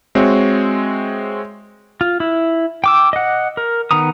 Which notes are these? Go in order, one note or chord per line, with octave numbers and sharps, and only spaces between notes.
G#3 C4 F#4 C#5 E5
F4
E4
G5 D6 E6
D#5 F#5
A#4
D#3 B3 A#5 D#6